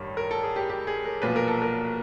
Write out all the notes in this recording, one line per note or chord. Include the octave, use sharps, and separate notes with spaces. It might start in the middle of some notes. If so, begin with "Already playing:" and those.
Already playing: A1 G2 D#3
A#4
A4
G#4
G4
G4
G#4
A#4
B1 A#2 F3 B4
A#4
A4
A#4